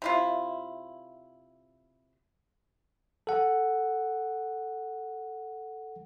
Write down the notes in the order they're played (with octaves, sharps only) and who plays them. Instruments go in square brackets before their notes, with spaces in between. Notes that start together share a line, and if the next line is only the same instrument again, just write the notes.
[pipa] C3 E4 F4
[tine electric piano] A4 F#5